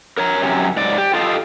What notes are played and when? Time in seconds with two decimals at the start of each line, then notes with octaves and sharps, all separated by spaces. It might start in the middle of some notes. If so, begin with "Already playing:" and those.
0.18 A#4 C#5 A#5
0.41 F#2 C3 C#4
0.76 G#2 D5
0.98 G4
1.14 F4 G4 A4 D#5 F5